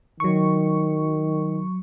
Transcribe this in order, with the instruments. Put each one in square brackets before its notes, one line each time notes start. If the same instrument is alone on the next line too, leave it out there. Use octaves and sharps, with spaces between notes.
[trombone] D#3 [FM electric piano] F#3 C#6